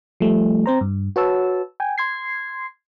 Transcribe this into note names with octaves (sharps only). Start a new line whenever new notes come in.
F3 G3 A3
C4 C5 A#5
G2
F#4 B4 C#5 A5 E6
G5 G#5
C6 G#6 C7